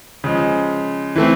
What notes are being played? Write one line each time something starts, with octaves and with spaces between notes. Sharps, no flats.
C#3 F3 G#3
E3 A3 C4